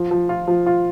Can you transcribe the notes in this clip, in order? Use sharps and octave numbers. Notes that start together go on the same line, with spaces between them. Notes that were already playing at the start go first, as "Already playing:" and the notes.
Already playing: F3
F3
F4
F3
F4